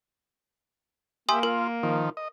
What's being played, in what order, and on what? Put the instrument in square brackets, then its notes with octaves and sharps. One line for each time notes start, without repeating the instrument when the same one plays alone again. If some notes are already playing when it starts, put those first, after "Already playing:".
[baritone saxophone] A#3 [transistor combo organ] G4 E5 [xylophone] G#5 C6 D#6
[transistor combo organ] F4 [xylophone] A#4
[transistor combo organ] D#3 F3
D#5